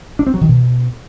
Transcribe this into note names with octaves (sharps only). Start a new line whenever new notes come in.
D4
C4
F#3
D#3
B2